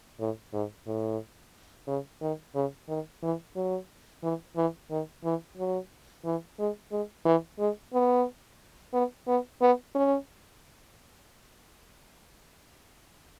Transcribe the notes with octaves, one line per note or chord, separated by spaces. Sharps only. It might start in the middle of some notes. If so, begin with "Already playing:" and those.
A2
G#2
A2
C#3
D#3
C#3
D#3
E3
F#3
E3
E3
D#3
E3
F#3
E3
G#3
G#3
E3
G#3
B3
B3
B3
B3
C#4